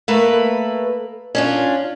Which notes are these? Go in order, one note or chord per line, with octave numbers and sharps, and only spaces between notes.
A3 A#3 B4
C#4 D4 F4